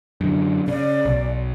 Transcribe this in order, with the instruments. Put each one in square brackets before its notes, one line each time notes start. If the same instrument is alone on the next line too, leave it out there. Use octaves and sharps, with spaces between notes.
[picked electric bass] F#2 D3
[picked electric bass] C#3 [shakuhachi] D5
[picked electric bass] B1